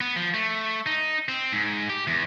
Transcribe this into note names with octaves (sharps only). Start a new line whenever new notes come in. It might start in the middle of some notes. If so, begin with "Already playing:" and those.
B3
F3
A3
D#4
C4
G#2
G4
E2